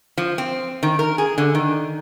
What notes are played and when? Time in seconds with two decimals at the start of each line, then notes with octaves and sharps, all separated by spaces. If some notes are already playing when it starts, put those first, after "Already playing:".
0.18 F3
0.38 C4
0.83 D#3
0.99 A#4
1.18 G#4
1.38 D3
1.55 D#3